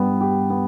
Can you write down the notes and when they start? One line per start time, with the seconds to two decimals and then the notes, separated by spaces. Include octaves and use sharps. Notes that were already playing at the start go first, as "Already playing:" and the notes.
Already playing: G2 B3 G4
0.21 G4
0.50 B3